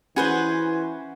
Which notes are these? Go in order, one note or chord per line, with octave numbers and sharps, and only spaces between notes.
E3 C#4 F#4 G#4 B4 C5